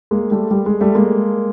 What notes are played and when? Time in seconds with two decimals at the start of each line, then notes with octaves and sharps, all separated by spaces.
0.11 G#3 A#3
0.31 G3 A3
0.51 G3
0.66 G#3
0.81 G3 A3
0.95 G#3 A#3